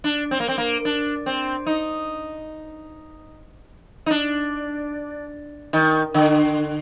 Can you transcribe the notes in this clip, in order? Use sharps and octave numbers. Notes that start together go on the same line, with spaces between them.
D4
C4
A#3
C4
A#3
D4
C4
D#4
D#4
D4
D#3
D3